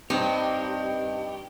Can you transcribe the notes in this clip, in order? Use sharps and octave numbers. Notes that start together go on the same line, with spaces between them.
G2 C4 D#4 G4